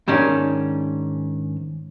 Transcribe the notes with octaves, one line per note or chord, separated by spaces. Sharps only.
G#2 D#3 C#4 D4